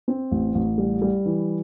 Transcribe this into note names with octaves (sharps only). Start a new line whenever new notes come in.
C4
A1
A1
G3
G3
E3